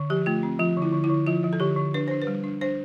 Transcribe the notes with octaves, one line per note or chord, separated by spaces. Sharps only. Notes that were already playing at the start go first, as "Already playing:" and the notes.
Already playing: D3
F3 G4
A3 F4
C4
F3 F4
D3
E4
D3
E4
D3
F3 F4
F3
A4
D3 G4
D3
D4 B4
D4 C5
B4
G3
D4
D4 C5